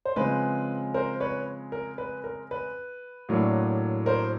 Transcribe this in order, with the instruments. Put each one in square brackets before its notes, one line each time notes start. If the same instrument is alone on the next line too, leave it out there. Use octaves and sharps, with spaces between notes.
[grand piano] C5
C#3 F3 G#3 C4 B4
A#4 C5
B4 C#5
A#4
B4
A#4
B4
A2 F#3 A#3 D4
A#4 C5